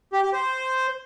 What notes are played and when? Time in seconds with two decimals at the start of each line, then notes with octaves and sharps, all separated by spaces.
0.13 G4
0.23 G4
0.33 C5